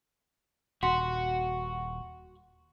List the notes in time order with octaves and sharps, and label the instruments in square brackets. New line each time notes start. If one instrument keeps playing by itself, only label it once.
[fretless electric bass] D#1 [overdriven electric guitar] F#4 [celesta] F#5 C6